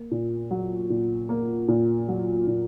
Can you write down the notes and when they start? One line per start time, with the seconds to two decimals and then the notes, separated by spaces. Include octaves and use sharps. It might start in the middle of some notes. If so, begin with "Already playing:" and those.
Already playing: A#3
0.11 A#2
0.51 F#3
0.90 A#2
1.29 A#3
1.68 A#2
2.08 F#3
2.47 A#2